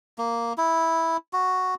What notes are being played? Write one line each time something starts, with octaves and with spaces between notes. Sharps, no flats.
A#3
E4
F#4